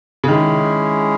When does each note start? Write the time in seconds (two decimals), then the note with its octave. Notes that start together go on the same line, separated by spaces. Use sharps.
0.24 C#3
0.28 D#3 G#3 C#4 E4 G#4